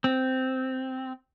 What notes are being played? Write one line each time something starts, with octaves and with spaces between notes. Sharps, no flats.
C4